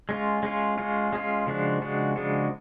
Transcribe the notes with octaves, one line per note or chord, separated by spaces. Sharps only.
G#3 C#4 F4
G#3 C#4 F4
G#3 C#4 F4
G#3 C#4 F4
C#3 F3 G#3 D4 F#4
C#3 F3 G#3 D4 F#4
C#3 F3 G#3 D4 F#4